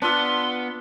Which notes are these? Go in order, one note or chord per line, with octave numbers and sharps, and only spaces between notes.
B3 D4 F4 C6 E6